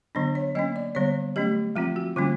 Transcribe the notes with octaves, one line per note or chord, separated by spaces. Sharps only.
D3 F#3 B3 D4
C#5
F#3 A#3 C#4 D#5
D5
D3 G3 B3 C#5
F#3 A3 C#4 G4
F3 G#3 C4 F4
F#4
D3 G3 A#3 C#4 F4